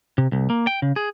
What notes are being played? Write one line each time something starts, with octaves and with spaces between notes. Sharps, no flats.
C3
C2
A#3
G5
C#3
G#4